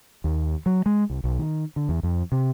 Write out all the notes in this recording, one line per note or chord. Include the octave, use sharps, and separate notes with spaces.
D#2
F#3
G#3
C2
B1
D#3
D3
E2
F2
C3